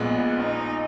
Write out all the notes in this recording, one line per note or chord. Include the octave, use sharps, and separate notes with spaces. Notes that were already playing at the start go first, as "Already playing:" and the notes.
Already playing: A#1 A#2 G#3 B3
D#4